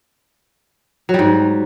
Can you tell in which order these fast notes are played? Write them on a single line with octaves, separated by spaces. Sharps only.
F#3 G3 G#2